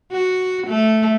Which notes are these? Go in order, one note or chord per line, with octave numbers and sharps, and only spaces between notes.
F#4
A3